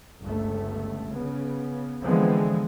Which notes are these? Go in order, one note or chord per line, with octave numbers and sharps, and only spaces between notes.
G1 C#2 A3
C#3 B3
D3 E3 F3 G#3 B3 C4